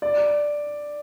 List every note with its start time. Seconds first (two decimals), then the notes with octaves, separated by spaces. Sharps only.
0.02 D5